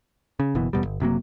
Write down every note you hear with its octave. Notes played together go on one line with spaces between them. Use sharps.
C#3
F#1 B2 E3
D#1 E2 B2 G3
G1
F#1 C3 F#3 A#3